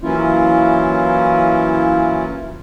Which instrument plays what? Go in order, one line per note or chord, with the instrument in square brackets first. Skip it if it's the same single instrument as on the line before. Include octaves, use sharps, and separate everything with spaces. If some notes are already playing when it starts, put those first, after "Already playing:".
[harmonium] E3 F#3 A#3 C#4 E4 F4